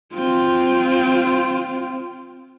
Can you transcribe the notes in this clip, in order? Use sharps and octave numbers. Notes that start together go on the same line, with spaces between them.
C4 F4